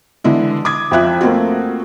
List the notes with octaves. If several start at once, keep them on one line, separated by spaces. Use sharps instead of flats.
D3 E3 G#3 E4
D6 D#6 G#6
F2 F4 E5 F#6
A3 A#3 C4 F4 F#4